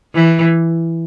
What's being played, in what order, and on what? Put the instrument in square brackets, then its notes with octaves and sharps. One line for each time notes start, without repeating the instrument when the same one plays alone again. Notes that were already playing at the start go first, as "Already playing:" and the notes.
[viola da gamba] E3